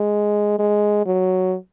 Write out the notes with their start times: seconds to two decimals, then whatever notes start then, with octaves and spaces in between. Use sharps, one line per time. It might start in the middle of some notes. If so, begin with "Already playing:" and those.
Already playing: G#3
0.59 G#3
1.06 F#3